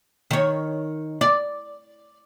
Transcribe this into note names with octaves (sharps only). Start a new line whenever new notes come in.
D#3 C#5
D5